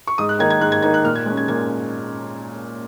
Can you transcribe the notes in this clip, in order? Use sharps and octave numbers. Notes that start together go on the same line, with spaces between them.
C#6
G#2 D#6
F#6
D#3 A#3 D#4 G#6
G#6
G#2 F#6
G#6
D#3 A#3 D#4 G#6
F#6
A#2 F6
G#6
G#3 C#4 F#6
G#6
A#2 G#6